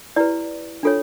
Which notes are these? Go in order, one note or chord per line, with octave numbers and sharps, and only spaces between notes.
E4 G4 B4 D5
D4 F4 A4 C#5